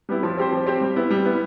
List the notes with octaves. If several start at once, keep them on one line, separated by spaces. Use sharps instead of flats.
G3 B3 E4
F3
C4 G4 C5
F3
C4 G4 C5
G3
B3 E4
G3
B3 E4